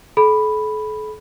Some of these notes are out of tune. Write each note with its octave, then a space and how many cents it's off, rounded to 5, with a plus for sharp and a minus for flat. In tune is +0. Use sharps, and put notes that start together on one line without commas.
A4 -40 B5 +0